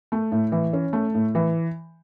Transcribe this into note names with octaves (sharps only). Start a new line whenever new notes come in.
A3
A2
E3
C#4
A3
A2
E3